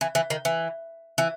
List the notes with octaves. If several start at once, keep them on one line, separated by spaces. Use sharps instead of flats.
E3
E3
D#3
E3
E3